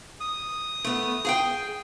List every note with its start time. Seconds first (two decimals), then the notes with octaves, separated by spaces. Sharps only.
0.20 D#6
0.84 A3 B3
1.25 G#4 F5 G5